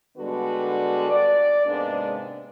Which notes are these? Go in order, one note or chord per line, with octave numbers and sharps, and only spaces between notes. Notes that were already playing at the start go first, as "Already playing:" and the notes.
D3 G3 G#3 B3 F#4 B4
D5
G#2 C3 G#3 A#3 B3 D4